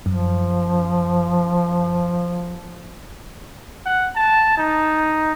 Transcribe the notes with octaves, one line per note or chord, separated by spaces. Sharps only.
F#2 F3
F#5
A5
D#4